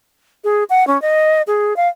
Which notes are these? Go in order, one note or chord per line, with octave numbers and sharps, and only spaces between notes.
G#4
F#5
C#4
D#5
G#4
F5